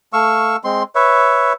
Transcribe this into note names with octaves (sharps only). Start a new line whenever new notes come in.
A3 F5 C#6 E6
G#3 C4 C6
B4 C#5 E5